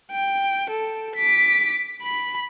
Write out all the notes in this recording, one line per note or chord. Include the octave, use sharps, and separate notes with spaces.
G5
A4
D6 B6
B5